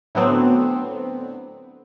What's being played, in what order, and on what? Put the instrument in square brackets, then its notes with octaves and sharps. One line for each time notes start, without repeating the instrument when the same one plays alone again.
[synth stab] A2 D3 F#3 B3 C4 D4